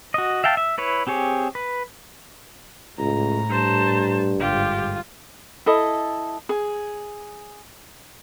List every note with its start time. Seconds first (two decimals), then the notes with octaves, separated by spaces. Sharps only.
0.14 F#4 D#5
0.44 E5 F5 G5 A5
0.57 E5
0.78 E4 B4 C#5
1.07 C4 G4 G#4 C#5
1.55 B4
2.99 C#2 A2 A#5
3.49 G2 C5 A5
4.40 G1 G#2 F4 G4
5.66 E4 A4 D#5
6.49 G#4